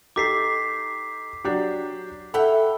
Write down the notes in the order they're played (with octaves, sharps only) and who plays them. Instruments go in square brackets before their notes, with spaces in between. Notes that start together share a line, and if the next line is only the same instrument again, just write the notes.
[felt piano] D#4 G4 A4 [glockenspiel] D6 B6 C7
[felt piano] F#3 D4 G4
[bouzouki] E4 E5 G5 [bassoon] A4 [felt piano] F#5 [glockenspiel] B5